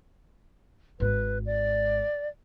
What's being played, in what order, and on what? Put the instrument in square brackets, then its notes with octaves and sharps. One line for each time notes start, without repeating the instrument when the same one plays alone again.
[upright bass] G#1 G#2 [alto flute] B4
[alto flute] D5